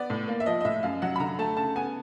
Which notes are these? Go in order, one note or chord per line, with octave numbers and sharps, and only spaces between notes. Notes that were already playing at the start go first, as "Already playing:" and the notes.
Already playing: B3 D5
A2
A#3
E5
F3 D#5
D#5
A2 E5
F#2 F5
F#3 F#5
B5
D3 A#5
A3 A5
C#3 A5
B3 G#5